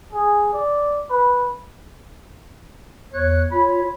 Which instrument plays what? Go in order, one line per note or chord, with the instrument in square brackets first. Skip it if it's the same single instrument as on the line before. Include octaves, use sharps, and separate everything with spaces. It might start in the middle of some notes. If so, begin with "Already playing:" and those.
[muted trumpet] G#4
D5
B4
[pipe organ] E2 F#6 [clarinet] C#5
[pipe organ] F4 C#5 [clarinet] B5